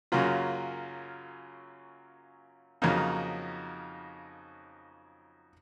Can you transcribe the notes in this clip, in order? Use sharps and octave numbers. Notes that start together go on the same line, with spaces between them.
F#2 C#3 F#3 A#3 F4
F2 C#3 F#3 A#3 D#4